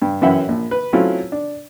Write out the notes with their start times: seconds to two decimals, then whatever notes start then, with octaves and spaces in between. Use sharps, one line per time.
0.02 G2
0.22 F#2 E3 C#4 E5 F#5 G5
0.48 A#1
0.71 B4
0.93 F#3 A3 C4 C#4 E4 F4
1.32 D4